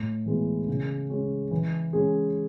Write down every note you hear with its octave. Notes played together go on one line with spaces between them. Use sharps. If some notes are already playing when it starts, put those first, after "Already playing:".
Already playing: A2
E3 G#3 B3 E4
C#3
G#3 C#4
E3
G#3 C#4 G#4